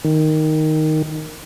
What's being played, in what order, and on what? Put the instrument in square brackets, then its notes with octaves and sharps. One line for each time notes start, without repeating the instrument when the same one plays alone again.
[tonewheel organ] D#3